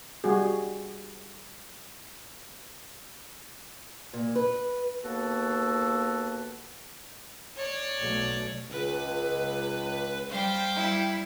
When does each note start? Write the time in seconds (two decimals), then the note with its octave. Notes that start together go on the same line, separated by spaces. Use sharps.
0.24 G3 F#4 G#4
4.13 A#2
4.35 B4
5.04 D#2 B2 A#3 B3 F#4 A4
7.57 C#5 D5
7.99 B1 A3
8.71 C#2 B4
10.30 G3 C5 F5 G5
10.75 G3 E4